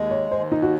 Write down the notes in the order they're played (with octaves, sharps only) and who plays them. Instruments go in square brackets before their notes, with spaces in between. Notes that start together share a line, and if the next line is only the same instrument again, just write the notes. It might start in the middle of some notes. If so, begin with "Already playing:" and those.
Already playing: [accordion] D#2 G#3
[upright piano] C#5
[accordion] D#2 [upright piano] C5
[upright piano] D#4
F#4